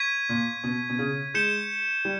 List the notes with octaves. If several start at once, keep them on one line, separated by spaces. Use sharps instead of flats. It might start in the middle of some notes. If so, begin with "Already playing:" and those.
Already playing: C#6 G#6 B6 D#7
A#2
B2
B2
C#3
G#3 G6 C#7 E7 G7
G3